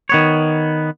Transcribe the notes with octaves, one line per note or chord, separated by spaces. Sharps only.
D#3 B3 C#5